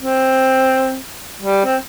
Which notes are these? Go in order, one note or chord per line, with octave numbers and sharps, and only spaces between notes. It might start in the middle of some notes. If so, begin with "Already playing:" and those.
C4
G3
C4